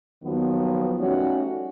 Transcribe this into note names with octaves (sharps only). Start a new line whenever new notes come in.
D#2 D#3 F3 F#3 B3
G3 A3 C#4 D#4 F#4 C#5